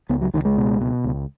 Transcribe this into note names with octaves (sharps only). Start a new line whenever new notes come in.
C#2 B3
F#3
C#2 D#3
G#3
B2
B2
C#2